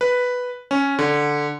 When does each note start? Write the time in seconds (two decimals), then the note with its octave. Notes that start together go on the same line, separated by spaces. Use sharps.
0.01 B4
0.71 C#4
0.99 D3